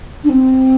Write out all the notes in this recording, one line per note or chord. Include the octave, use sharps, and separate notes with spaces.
D4
C4